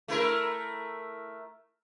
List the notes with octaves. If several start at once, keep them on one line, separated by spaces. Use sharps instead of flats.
A3 E4 A#4